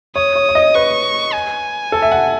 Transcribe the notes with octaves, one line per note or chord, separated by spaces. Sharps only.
C#5 D#6
C#5
C#5
D#5
B4 C#6
G#5
A4
E5
F#5